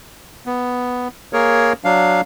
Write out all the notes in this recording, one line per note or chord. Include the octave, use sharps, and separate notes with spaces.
B3
A#3 G#4 A#4 C#5
F#3 D4 F5